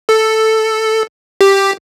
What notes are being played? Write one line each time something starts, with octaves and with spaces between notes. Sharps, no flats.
A4
G4